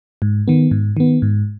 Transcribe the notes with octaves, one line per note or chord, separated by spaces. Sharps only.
G#2
D#3 B3
G#2
D#3 B3
G#2